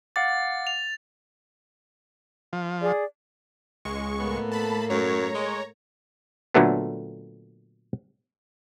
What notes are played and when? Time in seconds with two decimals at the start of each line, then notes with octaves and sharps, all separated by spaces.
0.16 F5 F#5 D6 A6
0.67 F7
2.53 F3
2.82 G#4 D5
3.85 C#2 G#3 C#6
4.19 A2 A#3 B3 A4
4.52 A5 B5
4.90 F#2 C#5 A#5
5.34 G#3
6.54 A#2 D3 F#3 A3 B3